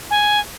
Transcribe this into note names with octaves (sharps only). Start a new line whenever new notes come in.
G#5